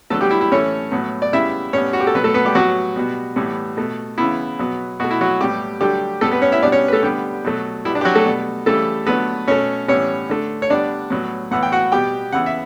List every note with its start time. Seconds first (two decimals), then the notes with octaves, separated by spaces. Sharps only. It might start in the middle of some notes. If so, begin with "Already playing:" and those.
0.10 D3 F#3 A3 B3 A4
0.21 G3 G4
0.31 E4
0.41 E4
0.52 A2 E3 A3 C#4 C#5
0.92 A2 F#3 B3
1.22 D5
1.33 C#3 G3 B3 E4 E5
1.73 A2 G3 B3 C#4 C#5
1.93 F#4
2.00 G4
2.07 A4
2.14 B2 F#3 B3 B4
2.24 A3 A4
2.34 B3 B4
2.45 G3 G4
2.55 A2 F#3 B3 F#4
2.96 B2 G3 B3
3.36 A2 E3 G3 B3
3.77 B2 A3
4.18 C#3 E3 B3 E4
4.59 B2 F#3 B3
5.00 B2 A3 F#4
5.11 E4
5.21 F#3 F#4
5.41 A2 G3 B3 G4
5.81 D3 F#3 G3 A3 G4
6.21 A2 G3 A3 B3 A4
6.32 B3 B4
6.42 C#4 C#5
6.52 E4 E5
6.62 B2 G3 B3 D4 D5
6.72 C#4 C#5
6.88 B4
6.93 A3 A4
7.03 D3 G3 B3 G4
7.45 B2 F#3 A3
7.85 B2 G3 B3 E4
7.95 D4
8.01 G4
8.05 F#3 F#4
8.15 A3 A4
8.25 B2 G3 B3
8.66 C#3 E3 G3 A3 A4
9.07 D3 F#3 A3 B3 B4
9.48 B2 A3 C#4 C#5
9.88 A2 E3 G3 B3 C#4 C#5
10.29 D3 A3
10.62 C#5
10.70 D3 G3 B3 D4 D5
11.10 A2 F#3 B3
11.51 A2 E3 B3 F#5
11.63 G5
11.72 F#4 F#5
11.92 B2 G3 B3 G4 G5
12.33 C#3 E3 B3 F#5
12.46 E5